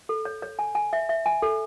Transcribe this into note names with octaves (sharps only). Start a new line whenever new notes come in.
A4
C#5
C#5
G#5
G#5
E5
E5
G#5
A4